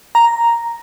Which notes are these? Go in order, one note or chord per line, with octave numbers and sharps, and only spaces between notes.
A#5